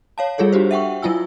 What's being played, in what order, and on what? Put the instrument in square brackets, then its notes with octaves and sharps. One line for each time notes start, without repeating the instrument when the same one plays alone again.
[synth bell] C#5 F5 A5
G3 F4 G#4 A4 C#5
D4 F#4 G4 C5
E5 F#5 G5 C#6
F#3 E4 F4 G#5 E6